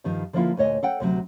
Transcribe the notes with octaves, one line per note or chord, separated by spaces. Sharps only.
G2 D#3 F3 G3
D3 F3 G3 A#3 E4 F4
D2 A#2 C#5 D#5 G#5
A4 F#5 G5
D2 C3 F#3